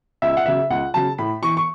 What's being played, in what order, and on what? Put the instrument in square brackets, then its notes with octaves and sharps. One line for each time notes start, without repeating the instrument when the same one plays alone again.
[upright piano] C#2 E5
F#5
C#3 F#3 E5
C#2 F#5
C#3 F#3 A5
A2 B5
E3 C#6
C#6